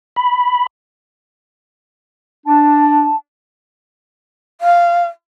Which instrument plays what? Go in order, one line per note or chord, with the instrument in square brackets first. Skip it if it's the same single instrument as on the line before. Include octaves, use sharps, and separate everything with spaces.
[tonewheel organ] B5
[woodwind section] D4 [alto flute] A5
[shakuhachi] F5